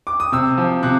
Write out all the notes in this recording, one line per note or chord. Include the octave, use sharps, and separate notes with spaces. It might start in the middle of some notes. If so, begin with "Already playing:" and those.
D6
D#6
C3 E6
F3
C3 F#6